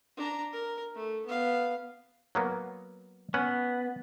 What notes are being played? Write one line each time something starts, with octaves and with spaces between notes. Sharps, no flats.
D4 A#5
A#4
A3
B3 F5
F#3 A#3 B3
B3 C#4 B4